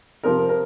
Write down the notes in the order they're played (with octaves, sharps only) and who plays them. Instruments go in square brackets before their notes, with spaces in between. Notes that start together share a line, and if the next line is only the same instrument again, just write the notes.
[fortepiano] C3 F3 C4 A#4
A#4